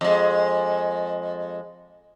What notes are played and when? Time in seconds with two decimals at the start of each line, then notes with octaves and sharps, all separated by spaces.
0.01 F2 G#3